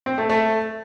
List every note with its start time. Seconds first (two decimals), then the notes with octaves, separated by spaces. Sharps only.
0.06 C4
0.18 A3
0.29 A3